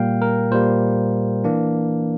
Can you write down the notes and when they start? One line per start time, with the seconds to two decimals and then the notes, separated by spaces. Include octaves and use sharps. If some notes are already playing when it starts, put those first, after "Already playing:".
Already playing: A#2 G3 A#3 F5 G5
0.22 A#4
0.51 A#2 G3 A#3 C5
1.44 E3 A#3 D4